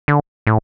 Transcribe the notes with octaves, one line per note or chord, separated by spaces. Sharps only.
D3
A2